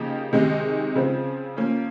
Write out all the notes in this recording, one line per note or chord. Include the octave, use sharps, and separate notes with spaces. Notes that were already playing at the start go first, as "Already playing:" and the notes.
Already playing: C#3 F3 A#3 D#4 G4
C3 D#3 G#3 D#4
C#3 F3 C4
F3 A#3 C#4